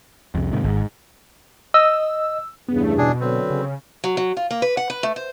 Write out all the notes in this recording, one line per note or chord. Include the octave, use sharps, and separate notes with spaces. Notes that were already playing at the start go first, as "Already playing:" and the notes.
C2 F2
G#2 C3 D#3
G#1 G#2
D#5 E6
E2 G2 C#3 B3
A3
B2 D4 G#4
D3 F#3 C4 B4
C#3
F#3
F#3
F4
A#3
B4
F#5
B4
A3
C5